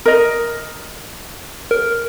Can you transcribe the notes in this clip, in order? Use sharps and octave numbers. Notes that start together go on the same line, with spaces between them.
A#4 D#5
A#4